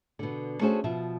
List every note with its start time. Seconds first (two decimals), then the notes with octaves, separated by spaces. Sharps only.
0.19 B2 D3
0.61 A3 C#4 D4 F#4 G#4 C5
0.84 B2 F3 E5